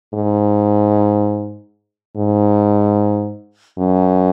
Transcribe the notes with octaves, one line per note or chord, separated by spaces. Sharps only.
G#2
G#2
F#2